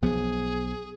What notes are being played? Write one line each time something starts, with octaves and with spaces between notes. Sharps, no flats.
B1 F3 B3 G#4